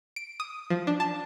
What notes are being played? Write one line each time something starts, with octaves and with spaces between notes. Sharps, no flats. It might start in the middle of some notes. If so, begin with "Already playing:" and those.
D7
D#6
F3
D4
A5